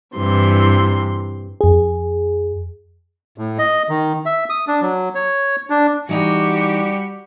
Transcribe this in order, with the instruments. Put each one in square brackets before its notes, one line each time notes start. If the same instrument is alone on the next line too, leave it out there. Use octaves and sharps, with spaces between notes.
[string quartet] G2 C3 E3 C6
[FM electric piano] F2 G#4
[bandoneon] A2
D#5
D#3
E5
D#6
D4
F#3
C#5
D4
[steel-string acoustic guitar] E3 D#4 G5 [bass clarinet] G3 [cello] F#4 G4